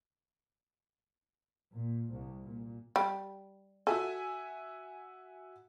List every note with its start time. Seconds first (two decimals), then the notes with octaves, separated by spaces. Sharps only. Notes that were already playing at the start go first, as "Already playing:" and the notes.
1.74 A#2
2.12 C2
2.43 A#2
2.96 G3
3.87 F#4 A4 E5 G#5